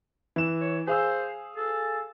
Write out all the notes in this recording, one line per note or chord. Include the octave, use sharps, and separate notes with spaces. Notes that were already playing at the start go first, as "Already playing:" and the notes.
E3 E7
C#5
G#4 C5 F5 E6
A4